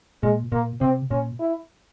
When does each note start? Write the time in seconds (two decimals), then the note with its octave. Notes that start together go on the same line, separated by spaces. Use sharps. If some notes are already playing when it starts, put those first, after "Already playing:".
0.23 A#2 G#3
0.52 A#2 A#3
0.81 C3 C4
1.11 A#2 C#4
1.40 E4